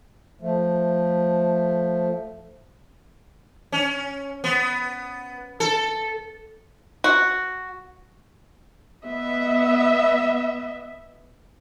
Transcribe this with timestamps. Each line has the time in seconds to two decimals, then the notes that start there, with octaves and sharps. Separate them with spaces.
0.41 F3 A3
3.72 C#4
4.44 B3
5.60 A4
7.04 F#4
9.05 B3 D#5 E5